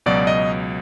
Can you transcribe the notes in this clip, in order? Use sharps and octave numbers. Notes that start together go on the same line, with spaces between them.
C#2 B2 F#3 D5
D#5